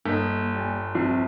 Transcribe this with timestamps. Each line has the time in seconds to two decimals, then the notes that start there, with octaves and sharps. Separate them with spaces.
0.06 G1 A#3 D#5 G6 B6
0.54 G3 G#5
0.95 A#1 F3 C4 C7